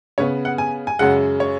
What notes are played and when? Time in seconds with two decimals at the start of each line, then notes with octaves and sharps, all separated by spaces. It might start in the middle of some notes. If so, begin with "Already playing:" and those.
0.18 C#3 B3 C#5
0.45 F#5
0.58 G#5
0.87 G#5
0.99 F#2 C#3 G#3 F#5
1.40 C#5